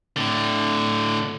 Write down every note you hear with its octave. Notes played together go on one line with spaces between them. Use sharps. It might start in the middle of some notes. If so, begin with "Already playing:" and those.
A2 D3